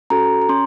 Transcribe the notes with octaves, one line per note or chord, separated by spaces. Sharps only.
C#4 F#4 A4 A#5
A#5
C#4 C6